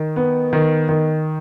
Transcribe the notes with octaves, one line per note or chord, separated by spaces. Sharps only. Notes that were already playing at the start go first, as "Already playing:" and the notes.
Already playing: D#3
B3
D#3
D#3